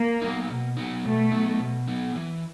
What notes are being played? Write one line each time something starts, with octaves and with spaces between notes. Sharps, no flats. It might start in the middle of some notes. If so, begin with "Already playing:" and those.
Already playing: A#3
F#3 B3 D#4
B2
F#3 B3 D#4
B2 A3
F#3 B3 D#4
B2
F#3 B3 D#4
E3